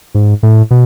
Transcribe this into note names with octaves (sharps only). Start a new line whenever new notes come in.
G#2
A2
B2